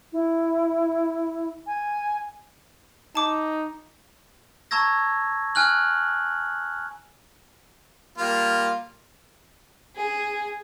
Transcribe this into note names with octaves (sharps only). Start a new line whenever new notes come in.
E4
G#5
D#4 A5 D6
A5 A#5 C#6 E6 G#6 A#6
G#5 F6 F#6 F#7
G3 A#3 F4
G#4